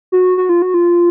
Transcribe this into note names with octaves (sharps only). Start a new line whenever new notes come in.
F#4
F#4
F4
F#4
F4